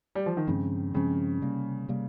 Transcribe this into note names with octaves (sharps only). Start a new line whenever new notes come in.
G3
F3
D#3
G2 C#3 F3 G#3 C4
G2 C#3 F3 G#3 C4
C3 G3 A#3
C3 G3 A#3